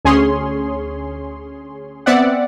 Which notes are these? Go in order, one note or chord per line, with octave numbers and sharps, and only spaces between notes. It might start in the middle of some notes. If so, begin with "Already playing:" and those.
D2 C#4 G#4 C#5 C6
B3 C4 D5 E5 F#5